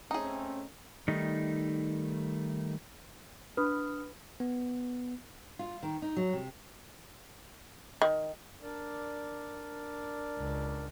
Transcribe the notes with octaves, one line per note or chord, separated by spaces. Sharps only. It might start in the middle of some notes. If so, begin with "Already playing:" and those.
A3 C4 C#4 D#4 G#4
D#3 G3 A3 D#4
D4 B4 D#6 F6
B3
F4
D#3
D#4
F#3
C3
D#3
D4 A#4 D5
C#2